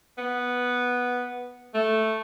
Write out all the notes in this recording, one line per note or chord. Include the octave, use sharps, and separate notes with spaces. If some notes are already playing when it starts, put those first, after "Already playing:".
B3
A3